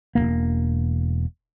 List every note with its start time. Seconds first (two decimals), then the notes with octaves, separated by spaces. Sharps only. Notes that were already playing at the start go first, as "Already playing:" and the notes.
0.15 E1 F2 A#3